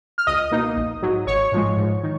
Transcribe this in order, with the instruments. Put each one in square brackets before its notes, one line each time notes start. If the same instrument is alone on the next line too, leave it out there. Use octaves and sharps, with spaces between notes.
[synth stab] F6
C#2 D#5 D#6
B2 A#3 D#4
A#1
G#2 F#3
G#1 C#5 C#6
G#2 F3 G#3
G#2
D#3